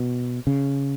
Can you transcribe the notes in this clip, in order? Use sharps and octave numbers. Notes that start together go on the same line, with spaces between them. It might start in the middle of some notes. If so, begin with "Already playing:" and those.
Already playing: B2
C#3